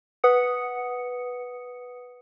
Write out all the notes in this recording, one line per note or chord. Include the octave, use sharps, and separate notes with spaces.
B4 F#5 D#6 C#7